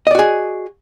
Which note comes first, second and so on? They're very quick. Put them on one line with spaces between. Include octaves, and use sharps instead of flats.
D#5 D5 F#4 G#4